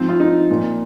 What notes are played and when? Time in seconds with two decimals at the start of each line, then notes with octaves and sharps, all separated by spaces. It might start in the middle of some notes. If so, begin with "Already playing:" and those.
Already playing: G#2 F3 C4
0.09 F4
0.20 D#4
0.50 A#2 F3